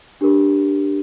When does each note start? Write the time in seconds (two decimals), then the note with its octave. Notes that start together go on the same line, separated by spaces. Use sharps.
0.21 D4 G4 A#4